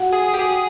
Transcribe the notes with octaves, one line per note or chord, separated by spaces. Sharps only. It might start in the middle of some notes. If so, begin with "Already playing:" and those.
Already playing: F#4 F#5
G#4
G4
G#4